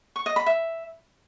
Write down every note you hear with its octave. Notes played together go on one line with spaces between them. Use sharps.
C#6
D#5
B5
E5